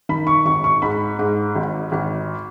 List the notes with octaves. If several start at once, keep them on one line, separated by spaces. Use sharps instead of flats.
D#3 B5
C#6
G#1 C#6
C#6
G#2 B5
G#2
G#1
G#1